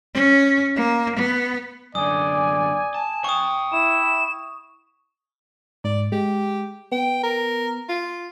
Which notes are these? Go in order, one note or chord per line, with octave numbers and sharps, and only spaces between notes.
C#4
A#3
B3
F#2 D3 D5 G#5 D#6
A5
F5 G5 C#6 D#6
E4 E7
G#2 D5
G#3 G4
B3 G5
A#4
F4